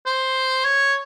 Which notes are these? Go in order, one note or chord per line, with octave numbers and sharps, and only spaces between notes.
C5
C#5